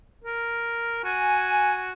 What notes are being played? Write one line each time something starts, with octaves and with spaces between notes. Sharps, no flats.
A#4
F#4 G#5